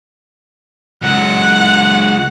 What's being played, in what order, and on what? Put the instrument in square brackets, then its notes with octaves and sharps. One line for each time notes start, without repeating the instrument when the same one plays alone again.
[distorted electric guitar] C#2 F#3 [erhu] F#5